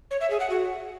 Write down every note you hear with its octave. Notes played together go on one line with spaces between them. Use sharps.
C#5
E5
G#4
F#5
F#4